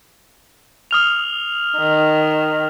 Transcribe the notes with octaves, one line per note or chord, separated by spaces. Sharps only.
D#6 F6 F7
D#3